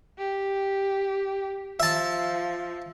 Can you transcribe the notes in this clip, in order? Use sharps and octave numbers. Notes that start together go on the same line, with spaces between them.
G4
F3 E5 A5